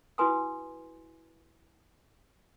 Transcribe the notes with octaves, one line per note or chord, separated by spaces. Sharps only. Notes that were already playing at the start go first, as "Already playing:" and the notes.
E4 F#4 B4 G#5 C6 D#6